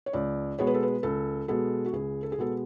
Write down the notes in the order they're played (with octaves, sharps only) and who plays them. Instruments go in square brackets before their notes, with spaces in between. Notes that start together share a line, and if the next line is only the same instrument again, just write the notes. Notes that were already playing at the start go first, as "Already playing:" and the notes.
[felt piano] C#5
C#2 D5
B2 G#3 B3 C#5
B4
A4
B4
C#2 A4
B2 G#3 B3 A4
F#4
C#2 G#4
A4
G#4
B2 G#3 B3 A4